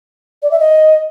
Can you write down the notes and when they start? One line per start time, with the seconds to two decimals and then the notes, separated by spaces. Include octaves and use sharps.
0.43 D5
0.51 E5
0.60 D#5